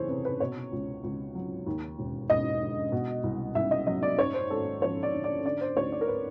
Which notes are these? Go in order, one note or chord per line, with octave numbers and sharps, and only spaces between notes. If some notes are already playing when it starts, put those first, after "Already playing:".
Already playing: F#1 E2 E3 G#4 A4 C5 C#5
C3 B4
B4
B2 C#5
C#2
C#2
F#3
D#2
E1
E1 D#5
D3
B2
C2
C2 E5
D#5
F#3 D#5
D5
F#2 C#5
C5
G#1 A4
F3 C#5
D5
D3
D5
D3 D5
C5
D2 C#5
D5
A#4
B4